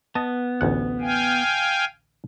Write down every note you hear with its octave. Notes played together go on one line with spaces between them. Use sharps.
B3 D#5 A5
A1 D2 F#5
F5 G5 G#5